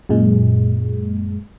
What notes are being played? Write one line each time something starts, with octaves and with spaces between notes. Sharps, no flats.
F#2 A#2 G#3